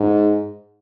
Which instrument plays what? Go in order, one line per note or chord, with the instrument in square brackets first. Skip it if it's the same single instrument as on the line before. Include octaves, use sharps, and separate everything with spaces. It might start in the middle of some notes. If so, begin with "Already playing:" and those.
Already playing: [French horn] G#2